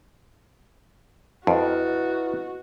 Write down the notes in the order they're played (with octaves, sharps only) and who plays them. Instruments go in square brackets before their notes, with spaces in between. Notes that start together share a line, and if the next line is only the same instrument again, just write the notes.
[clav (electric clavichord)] F2 [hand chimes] E4 B4 D#5 [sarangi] F#4